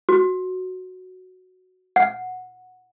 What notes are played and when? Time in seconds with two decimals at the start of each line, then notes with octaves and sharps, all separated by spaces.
0.09 F#4
1.96 F#5